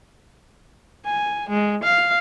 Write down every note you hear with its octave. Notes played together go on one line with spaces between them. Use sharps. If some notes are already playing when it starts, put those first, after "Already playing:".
G#5
G#3
F5